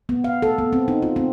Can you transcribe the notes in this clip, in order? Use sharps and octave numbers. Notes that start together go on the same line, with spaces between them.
B3
F5
A4
B3
C4
D#4
F4
C4